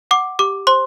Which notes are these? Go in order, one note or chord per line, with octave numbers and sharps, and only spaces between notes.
F#5 D6
G4 D6
C5 C6